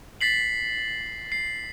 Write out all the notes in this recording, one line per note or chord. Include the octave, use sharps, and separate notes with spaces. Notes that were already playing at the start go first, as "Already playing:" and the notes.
A6 B6 C7 F#7
C7